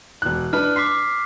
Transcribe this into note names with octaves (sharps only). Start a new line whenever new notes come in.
E1 F#6
D4 B4 F6
C6 D6 B6 C7